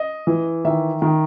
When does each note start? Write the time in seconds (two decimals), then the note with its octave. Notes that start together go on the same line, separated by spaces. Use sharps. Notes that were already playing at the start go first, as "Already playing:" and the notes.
Already playing: D#5
0.27 E3
0.65 D#3 E5
1.02 D#3